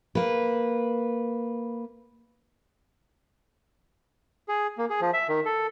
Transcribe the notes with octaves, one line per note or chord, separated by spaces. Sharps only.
A#3 B4
G#4
A#3
G#4
F3
E5
D#3
A4